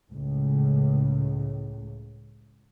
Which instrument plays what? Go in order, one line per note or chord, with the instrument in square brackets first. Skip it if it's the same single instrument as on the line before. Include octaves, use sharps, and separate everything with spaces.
[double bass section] C#2 A2